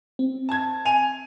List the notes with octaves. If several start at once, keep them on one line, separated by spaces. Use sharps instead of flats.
C4
A5 G#6
G#5 D#7 F7